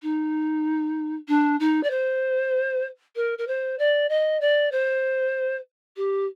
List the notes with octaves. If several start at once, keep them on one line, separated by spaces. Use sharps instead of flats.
D#4
D4
D#4
D5
C5
A#4
A#4
C5
D5
D#5
D5
C5
G4